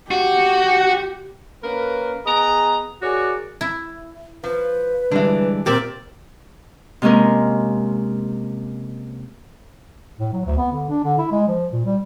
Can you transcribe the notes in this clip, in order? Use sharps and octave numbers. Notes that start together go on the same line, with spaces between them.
F#4 G4
A#3 C#4 A#4 B4
B3 G#4 D#5 A#5
F#4 G#4 A#4 C#5 D5
E4
F3 B4
D3 E3 G3 G#3 D4
A#2 A#3 C4 G4 A#4 D5 E5
C3 G#3 A#3 C#4 A#4
A2
F#3
D2
B3
D3
D4
D3
E4
G#3
F3
A#2
G3